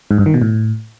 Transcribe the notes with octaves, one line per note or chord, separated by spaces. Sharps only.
G#2
G2
D#3
B2
A2